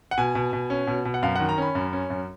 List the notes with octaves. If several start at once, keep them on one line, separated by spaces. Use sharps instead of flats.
F#5
B2 G#5
B2
B2
C#4
B2
B2
F#5
F#2 F5
F#5
D#3
A#5
C#4 B5
F#2
C#4
F#2